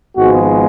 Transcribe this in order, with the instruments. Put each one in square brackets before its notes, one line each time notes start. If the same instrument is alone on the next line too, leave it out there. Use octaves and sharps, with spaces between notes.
[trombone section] G#1 G#2 F3 G#3 B3 F#4